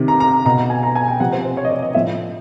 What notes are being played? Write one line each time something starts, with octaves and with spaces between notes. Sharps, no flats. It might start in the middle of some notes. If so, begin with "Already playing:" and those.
Already playing: C3 D#3
A#5
A#5
B2 A#5
G#5
A#5
G#5
G5
C3 F3 F#5
C5
C5
C#5
D#5
D5
D#5
A2 F3 E5